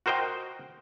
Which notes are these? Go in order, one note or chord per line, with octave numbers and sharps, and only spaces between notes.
F#4 A#4 C5 D#5 G5